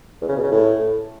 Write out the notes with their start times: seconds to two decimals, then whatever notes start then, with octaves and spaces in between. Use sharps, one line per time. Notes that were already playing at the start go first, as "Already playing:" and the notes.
0.21 E2
0.29 C#3
0.36 B2
0.44 C#3
0.52 A2